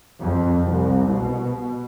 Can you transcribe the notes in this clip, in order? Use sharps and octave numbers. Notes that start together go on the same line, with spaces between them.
F2
C2
B2